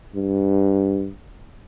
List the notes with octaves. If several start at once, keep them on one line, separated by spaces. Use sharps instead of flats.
G2